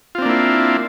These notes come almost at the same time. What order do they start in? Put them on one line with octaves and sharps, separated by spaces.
F4 C4 D4 A#3 E4